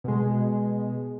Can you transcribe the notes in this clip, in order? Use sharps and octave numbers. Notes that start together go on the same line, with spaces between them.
B2 G#3